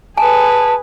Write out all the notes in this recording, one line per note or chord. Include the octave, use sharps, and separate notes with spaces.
G#4 B4 G#5 A5